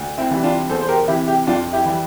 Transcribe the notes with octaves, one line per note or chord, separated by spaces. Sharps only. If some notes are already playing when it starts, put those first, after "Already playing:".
Already playing: D2
C4 E4
C3 E3 G3
D4 F4
E2 A4 C5
C5
G4 A#4
C3 E3 E4 G4
E4 G4
F2 D4 F4
E4 G4
E3 G3